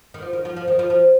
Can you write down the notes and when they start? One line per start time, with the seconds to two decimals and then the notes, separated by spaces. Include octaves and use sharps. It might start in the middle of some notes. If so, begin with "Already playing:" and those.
0.14 D#3
0.22 F3
0.33 D#3
0.45 F3
0.56 F3
0.68 D#3
0.79 F3
0.90 F3